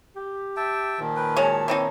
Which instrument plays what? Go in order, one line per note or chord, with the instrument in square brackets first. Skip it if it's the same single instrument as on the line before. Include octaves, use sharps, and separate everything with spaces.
[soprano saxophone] G4
[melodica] E5 G5 A5
[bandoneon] A#2 D#3 F3
[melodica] B4 [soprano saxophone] G5
[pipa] G#3 C#5 [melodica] F#4 [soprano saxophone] A5
[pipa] E3 C4 D#4 [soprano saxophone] C#5